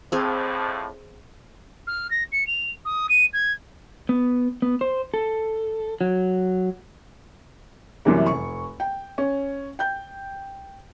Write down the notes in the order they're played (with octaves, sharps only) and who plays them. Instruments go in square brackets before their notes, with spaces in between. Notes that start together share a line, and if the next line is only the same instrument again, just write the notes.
[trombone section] F2 A2 [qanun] C4 G#4 F5
[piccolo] F6
A#6
C#7
F7
D#6
D#7
G#6
[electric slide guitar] B3
B3
C5
A4
F#3
[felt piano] F#2 C3 E3 G3 A#3
F1 C#6
G5
C#4
G5 G6